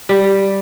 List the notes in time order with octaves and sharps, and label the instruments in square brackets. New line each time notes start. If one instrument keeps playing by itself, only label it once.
[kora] G3